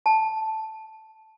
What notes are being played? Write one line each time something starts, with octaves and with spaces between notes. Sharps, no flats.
A5